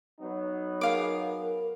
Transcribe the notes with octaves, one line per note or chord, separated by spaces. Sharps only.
F#3 B3 D#4
G#4 A#4 F5 D6